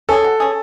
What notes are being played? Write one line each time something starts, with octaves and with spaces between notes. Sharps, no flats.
C#4 G#4 A4
F#3
C#4 G#4